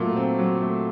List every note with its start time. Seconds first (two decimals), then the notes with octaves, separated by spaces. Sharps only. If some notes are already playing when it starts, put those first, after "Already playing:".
Already playing: A#2 F#3 A3
0.16 C4
0.39 F#3
0.61 A3